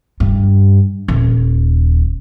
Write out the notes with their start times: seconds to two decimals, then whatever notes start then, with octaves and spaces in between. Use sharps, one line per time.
0.20 G2
1.08 D#1